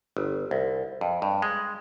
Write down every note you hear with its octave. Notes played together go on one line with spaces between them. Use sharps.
G1
C2
F2
G2
G#3